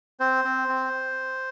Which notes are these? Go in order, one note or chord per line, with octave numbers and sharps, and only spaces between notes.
C4 C5
C4
C4